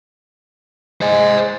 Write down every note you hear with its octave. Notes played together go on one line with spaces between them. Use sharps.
G#3 C5 D#5